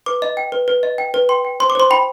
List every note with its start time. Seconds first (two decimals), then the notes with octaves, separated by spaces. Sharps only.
0.06 B4 D6
0.22 D#5
0.37 G5
0.52 B4
0.68 B4
0.83 D#5
0.98 G5
1.14 B4
1.29 G5 C6
1.45 G5
1.60 C5 C6
1.70 D6
1.75 C5 C6
1.90 G5 B5